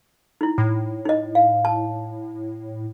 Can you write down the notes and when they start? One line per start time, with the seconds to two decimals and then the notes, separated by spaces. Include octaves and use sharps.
0.41 D#4 E4
0.58 A2
1.05 D#4 D#5
1.35 F5
1.65 A5